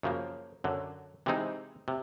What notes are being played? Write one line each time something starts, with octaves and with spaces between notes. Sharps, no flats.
F#2 C#3 F3 A#3
F#2 D3 F#3
C3 E3 G#3 C4 D#4
C3